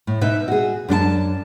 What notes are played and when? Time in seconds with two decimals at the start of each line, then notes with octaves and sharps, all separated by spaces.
0.07 A2
0.21 B2 D#4 B4 E5
0.48 F#4 G#4
0.88 F#2 D4 F4 A5